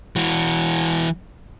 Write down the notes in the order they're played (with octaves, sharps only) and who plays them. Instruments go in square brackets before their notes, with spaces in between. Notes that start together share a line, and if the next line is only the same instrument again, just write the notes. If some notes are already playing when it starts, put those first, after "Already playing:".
[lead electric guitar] E3 F#4